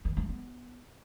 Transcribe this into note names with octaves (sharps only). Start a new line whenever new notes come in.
D#3
A3
B3